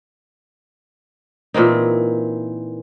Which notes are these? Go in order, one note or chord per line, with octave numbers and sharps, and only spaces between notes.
A#2 E3 C4 D#4